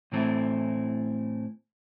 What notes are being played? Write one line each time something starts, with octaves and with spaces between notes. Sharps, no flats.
A2 E3 A3 C4 E4